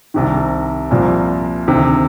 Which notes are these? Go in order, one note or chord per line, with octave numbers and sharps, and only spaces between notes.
C2 C3 D#3
C2 A#2 F3
D2 C3 D#3